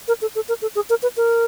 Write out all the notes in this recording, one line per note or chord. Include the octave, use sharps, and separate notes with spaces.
A#4
A4
A4
A#4
A4
G#4
A#4
B4
A#4